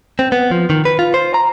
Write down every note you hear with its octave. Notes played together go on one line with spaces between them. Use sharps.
C4
B3
F3
D#3
B4
F4
C5
A#5